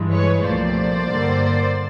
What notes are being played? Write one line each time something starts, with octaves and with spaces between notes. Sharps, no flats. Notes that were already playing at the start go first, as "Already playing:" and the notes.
Already playing: G2 E3 G#3
B4 C#5
C2 A#2 F3 A3 C5 D5
G2 D3 G3 A#3